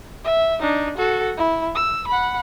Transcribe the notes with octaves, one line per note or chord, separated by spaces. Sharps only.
E5
D4 D#4
F#4 A4
E4
E6
F#5 B5